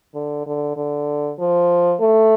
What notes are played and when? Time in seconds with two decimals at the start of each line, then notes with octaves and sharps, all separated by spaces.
0.14 D3
0.46 D3
0.76 D3
1.39 F3
2.00 A3